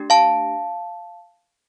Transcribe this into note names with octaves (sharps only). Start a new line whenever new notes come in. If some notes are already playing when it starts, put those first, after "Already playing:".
Already playing: A3 D4 G4
F5 A5